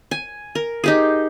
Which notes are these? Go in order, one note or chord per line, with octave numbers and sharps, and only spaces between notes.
G#5
A#4
D#4 G4 G#4